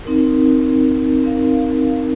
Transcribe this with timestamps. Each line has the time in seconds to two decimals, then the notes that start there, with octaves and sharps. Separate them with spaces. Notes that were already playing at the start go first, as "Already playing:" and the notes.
0.05 C4 D#4 A#4
1.23 C4 D#4 A#4 F5